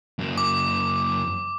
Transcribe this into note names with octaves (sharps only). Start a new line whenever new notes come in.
F#2 A#3
D6